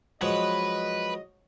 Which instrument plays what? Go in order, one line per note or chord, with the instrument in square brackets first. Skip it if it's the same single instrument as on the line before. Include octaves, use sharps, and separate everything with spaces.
[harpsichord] F3 F#3 G#3 [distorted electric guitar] B4 [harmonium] D#5